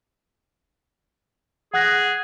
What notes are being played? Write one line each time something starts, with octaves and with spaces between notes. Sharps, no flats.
G#4 F#5 F#6 A#6